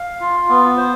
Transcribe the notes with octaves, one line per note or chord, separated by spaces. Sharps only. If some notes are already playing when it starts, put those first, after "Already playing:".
Already playing: F5
F4
B3
C5